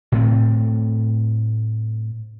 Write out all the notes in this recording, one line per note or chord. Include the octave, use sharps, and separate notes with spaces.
A2 A3 C4